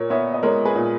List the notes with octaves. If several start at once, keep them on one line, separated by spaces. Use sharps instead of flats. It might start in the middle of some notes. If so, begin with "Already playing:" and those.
Already playing: A#2 A#4 C#5
B3 C#5 E5
D#5
G#3 A#4 C#5
G#4 B4
A#2